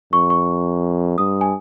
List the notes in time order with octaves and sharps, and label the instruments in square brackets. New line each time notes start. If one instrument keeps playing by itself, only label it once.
[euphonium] F2 [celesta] C#6
[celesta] C#6
[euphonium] G2 [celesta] D#6
[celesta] G#5